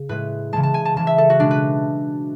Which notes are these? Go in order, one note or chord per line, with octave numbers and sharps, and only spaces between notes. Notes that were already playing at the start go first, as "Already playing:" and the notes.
Already playing: C#3
A2 G#3 B4
C#3 E3 G#3 A5
A5
G#5
A5
C#3 E3 G#3 A5
E5
A4
F#4
B2 G#3 D4
B4